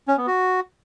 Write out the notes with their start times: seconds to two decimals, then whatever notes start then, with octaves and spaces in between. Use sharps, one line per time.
0.08 C#4
0.17 B3
0.27 F#4